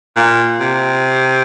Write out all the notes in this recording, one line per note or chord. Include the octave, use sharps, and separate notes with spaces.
A#2
C3